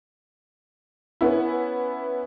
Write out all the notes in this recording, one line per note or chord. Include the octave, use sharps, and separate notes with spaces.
B3 C#4 E4